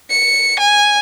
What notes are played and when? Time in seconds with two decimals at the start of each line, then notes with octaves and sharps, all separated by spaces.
0.10 C#7
0.60 G#5